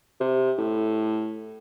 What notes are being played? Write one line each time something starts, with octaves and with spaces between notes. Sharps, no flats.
C3
A2